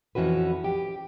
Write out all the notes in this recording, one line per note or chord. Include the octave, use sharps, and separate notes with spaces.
F2 E3 C#4 F#4 B4
G4